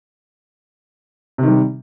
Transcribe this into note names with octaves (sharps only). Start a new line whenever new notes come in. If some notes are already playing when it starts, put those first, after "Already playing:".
C3 D#3 G3